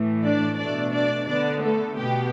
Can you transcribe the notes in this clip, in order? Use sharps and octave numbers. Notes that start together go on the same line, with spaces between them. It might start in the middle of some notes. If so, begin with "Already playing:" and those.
Already playing: A2 E3 A3
D4 D5
B2 A3 D4 D5
D4 D5
D3 B3 D4 D5
A3 A4
B2 B3 G4